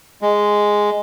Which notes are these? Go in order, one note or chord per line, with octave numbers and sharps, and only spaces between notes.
G#3